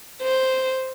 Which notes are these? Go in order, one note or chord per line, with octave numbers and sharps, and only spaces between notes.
C5